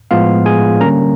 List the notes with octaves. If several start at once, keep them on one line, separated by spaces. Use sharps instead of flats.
A2 F3 G#3 B3 F4 F5
G#4 G#5
D3 G3 A#3 C#4 A#4 A#5